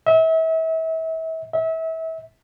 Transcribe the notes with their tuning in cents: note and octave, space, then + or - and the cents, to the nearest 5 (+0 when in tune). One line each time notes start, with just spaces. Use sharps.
E5 -35
E5 -30